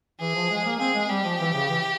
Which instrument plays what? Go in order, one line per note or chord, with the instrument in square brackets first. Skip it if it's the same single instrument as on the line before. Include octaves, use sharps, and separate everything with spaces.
[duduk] E3 [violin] G#4
[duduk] F3
G#3
A#3
[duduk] C4 [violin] G#4
[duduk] G#3
[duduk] G3 [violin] G4
[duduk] F3
E3
C#3
E3